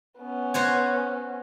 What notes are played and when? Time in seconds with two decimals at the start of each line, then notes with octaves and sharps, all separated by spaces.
0.19 B3 C#4
0.54 F#4 C5 C#5